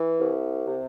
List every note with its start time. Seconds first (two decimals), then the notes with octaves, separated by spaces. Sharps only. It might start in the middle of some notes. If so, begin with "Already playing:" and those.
Already playing: E3
0.19 C2
0.66 C3